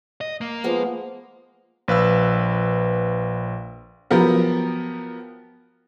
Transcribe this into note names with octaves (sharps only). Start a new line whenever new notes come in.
D#5
A#3
F3 G#3 B3
A#1 B4 F5 E6
F3 F#3 B3 G4 A#4